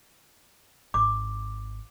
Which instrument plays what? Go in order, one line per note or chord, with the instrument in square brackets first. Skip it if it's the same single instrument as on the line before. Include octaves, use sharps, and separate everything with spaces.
[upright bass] G#1 [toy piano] D6